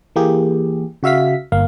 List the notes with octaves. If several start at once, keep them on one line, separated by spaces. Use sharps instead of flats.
E3 A#3 G4 G#4
C#3 F#4 E5 F5 B6
G1 A#3 F5